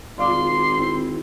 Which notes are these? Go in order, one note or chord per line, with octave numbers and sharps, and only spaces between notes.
G#1 F4 D5 F5 C6 D6
C4 E4